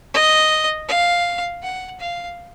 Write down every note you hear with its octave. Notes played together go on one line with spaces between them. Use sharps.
D#5
F5
F#5
F5